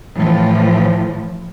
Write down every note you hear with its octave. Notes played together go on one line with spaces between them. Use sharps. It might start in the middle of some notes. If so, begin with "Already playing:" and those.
A2 E3 F3